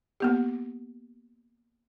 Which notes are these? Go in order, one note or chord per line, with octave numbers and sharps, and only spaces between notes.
A#3 B3 G4